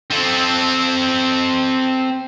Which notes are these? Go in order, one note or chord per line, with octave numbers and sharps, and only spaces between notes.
C4 A4